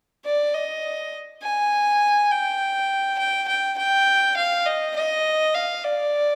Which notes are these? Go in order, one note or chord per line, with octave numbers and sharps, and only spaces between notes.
D5
D#5
G#5
G5
G5
G5
G5
F5
D#5
D#5
F5
D5